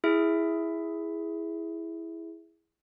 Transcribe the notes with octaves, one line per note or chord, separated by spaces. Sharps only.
E4 G#4 E5